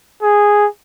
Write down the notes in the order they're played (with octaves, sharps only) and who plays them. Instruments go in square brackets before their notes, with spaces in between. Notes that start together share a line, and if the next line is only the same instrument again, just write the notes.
[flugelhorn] G#4